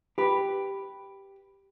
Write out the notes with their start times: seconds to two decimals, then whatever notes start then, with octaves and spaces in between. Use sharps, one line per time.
0.18 G4 B4